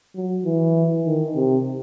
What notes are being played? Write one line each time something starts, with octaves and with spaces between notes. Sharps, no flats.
F#3
E3
D#3
C3